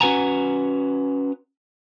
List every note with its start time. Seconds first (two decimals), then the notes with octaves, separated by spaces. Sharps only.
0.01 C#4 F#4 B4 F#5 G#5 A#5